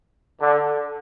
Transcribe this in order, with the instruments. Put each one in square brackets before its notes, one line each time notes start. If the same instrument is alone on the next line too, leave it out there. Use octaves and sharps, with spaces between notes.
[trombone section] D3